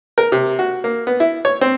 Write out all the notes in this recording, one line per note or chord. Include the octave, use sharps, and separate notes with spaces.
A#4
C3
F#4
A#3
B3
E4
C#5
C4